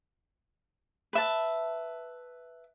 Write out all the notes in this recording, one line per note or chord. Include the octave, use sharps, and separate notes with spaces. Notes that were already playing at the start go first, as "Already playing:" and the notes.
B4 E5 A5